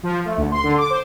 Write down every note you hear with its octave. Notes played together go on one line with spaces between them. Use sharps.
F3
A3
D2
C6
D3
D6
C5